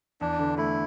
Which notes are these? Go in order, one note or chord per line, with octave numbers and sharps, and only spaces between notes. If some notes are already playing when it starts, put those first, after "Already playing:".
E2 D4
D3
A3 E4